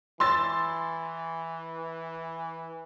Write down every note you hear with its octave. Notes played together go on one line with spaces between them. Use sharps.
E3 C6 E6 A6